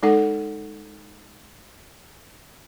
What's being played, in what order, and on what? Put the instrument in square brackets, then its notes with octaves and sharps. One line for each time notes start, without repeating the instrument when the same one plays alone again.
[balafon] G#3 D#4 A4 F#5